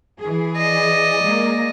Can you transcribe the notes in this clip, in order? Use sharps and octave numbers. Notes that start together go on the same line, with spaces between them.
E3 G#4
D5 D#5
G#3 A#3